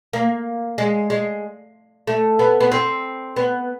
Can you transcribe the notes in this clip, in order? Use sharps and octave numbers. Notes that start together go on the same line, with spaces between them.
A#3
G#3
G#3
A3
B3
B3
C4
B3